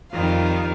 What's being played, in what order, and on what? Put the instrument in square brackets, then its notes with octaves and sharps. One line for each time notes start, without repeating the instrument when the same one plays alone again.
[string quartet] F2 D#3 G3 F4